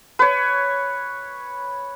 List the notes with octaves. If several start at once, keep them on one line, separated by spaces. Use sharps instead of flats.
B4 C#5